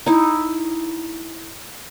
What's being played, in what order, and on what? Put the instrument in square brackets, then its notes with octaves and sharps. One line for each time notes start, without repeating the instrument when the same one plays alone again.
[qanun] D#4 E4